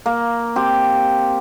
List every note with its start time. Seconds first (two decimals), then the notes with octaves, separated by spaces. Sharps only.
0.06 A#3
0.56 C4 G4